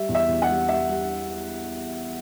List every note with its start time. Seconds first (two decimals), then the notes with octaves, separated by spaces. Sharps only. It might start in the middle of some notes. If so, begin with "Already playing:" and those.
Already playing: G3 E5
0.09 E2
0.15 E5
0.28 E2
0.42 F#5
0.49 G3
0.69 G3 E5
0.89 G3